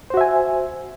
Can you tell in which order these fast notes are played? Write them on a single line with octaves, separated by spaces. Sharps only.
C5 F#4 E5 G#5